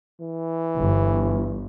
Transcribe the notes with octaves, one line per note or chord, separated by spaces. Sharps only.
E3
G1